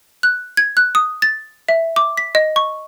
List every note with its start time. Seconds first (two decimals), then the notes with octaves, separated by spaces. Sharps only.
0.23 F#6
0.57 G#6
0.77 F#6
0.95 D#6
1.22 A6
1.69 E5
1.96 D6
2.17 B6
2.35 D#5
2.56 C#6